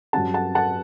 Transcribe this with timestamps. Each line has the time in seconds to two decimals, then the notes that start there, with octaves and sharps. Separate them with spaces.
0.13 G2 F#3 C#4 F#5 A5
0.34 F#5 A5
0.55 F#5 A5